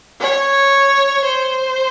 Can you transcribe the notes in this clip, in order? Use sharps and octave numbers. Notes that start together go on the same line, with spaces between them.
C#5
C5